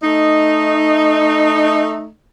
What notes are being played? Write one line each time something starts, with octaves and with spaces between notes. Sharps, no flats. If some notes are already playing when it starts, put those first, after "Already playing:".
A3 D#4